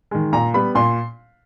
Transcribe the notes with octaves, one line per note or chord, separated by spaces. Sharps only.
D#3 G#3
A#2 A#5
G3 B3 B5
A#2 C6